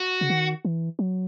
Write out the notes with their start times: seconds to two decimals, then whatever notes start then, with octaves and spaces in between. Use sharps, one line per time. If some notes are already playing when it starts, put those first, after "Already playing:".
Already playing: F#4
0.21 C#3
0.30 D#3
0.65 E3
0.99 F#3